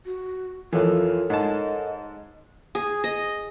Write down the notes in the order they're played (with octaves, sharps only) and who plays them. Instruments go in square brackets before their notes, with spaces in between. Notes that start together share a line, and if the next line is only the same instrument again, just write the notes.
[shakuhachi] F#4
[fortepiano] F2 E3 [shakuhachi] F4 [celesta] A4 A#4 C#5
[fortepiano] G#2 A5 [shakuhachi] D#5
[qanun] G#4
D#5